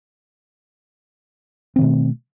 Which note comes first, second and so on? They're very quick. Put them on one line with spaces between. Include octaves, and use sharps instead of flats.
C4 D#3 B2 A3